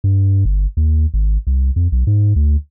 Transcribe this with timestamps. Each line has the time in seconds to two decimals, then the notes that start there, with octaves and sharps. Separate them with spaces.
0.04 G2
0.45 G1
0.77 D#2
1.14 G#1
1.47 C2
1.76 F2
1.92 B1
2.07 G#2
2.36 D2